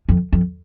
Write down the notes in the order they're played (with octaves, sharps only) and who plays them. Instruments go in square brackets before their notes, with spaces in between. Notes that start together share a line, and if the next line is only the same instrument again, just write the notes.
[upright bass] F2
F2